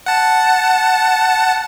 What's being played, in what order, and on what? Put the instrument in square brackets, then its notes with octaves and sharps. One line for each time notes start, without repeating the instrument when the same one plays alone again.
[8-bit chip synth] F#5 A5